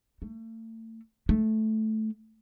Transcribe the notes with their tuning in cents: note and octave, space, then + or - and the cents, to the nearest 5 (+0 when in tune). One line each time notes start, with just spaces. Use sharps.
A3 +35
A3 -10